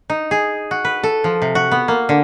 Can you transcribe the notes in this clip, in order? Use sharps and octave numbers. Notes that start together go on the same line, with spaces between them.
D#4
G#4
F#4
B4
A4
F3
C3
F#4
B3
A#3
D3